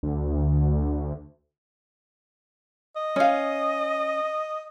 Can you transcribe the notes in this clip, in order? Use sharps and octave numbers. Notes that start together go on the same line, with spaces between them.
D2
D#5
C#4 F5